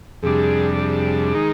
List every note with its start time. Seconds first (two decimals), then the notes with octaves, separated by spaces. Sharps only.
0.23 F2 C3 G3 D4 G#4
0.79 G#4
1.34 D#3 G#3 D#4